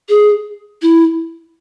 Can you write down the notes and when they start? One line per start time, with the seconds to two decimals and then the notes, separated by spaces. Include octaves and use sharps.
0.09 G#4
0.82 E4